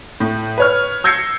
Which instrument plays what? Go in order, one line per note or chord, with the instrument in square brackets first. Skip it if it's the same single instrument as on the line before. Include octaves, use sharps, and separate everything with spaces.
[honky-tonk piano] A2
B4 C#5 F6
E6 G6 G#6 A#6 C7 C#7